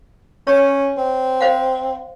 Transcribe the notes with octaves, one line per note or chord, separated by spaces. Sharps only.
C#4 C#5
C4
C5 F5 F#5